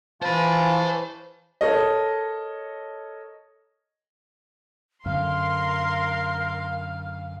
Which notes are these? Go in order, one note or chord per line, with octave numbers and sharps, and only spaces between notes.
E3 F4 C5 A5 B5
A4 A#4 C#5 D#5
F#2 D3 A#4 F5 C6 F6